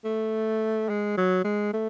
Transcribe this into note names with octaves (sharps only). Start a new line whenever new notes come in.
A3
G#3
F#3
G#3
A3